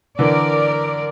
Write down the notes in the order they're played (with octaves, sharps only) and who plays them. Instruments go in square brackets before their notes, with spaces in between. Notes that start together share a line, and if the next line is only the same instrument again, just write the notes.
[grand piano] D3 E3 [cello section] A#4 D5